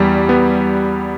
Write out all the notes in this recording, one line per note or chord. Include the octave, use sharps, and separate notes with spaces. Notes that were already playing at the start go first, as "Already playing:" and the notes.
Already playing: E2 G3
B3